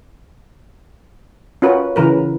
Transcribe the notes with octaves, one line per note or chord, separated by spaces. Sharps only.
C#4 F4 F#4 A#4 B4
C#3 E3 A#4 B4